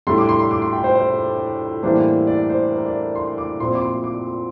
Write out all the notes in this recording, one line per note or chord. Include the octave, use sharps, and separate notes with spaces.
A2 G3 D4 C6
D6
C6
C6
D6
C6
G5
C5
C5
A2 E3 G3 A#3 D4 C5
D5
C5
A#4
D5
C6
D6
A#2 F3 C4 C6
D6
C6
D6